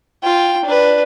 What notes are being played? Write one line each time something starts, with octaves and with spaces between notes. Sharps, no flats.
F4 G5
D4 B4